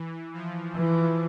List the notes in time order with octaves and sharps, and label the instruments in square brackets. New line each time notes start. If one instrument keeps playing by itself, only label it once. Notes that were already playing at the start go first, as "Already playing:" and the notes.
Already playing: [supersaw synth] E3
F3
[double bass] E3